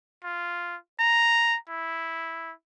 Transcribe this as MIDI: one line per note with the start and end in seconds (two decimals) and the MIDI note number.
0.24 0.76 65
1.00 1.56 82
1.69 2.52 64